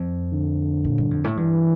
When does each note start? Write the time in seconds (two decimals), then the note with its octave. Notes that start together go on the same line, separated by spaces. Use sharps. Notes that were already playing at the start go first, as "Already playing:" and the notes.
Already playing: F2
0.32 D3
0.85 A#2
0.98 G2
1.11 F2
1.24 A2
1.37 G2 E3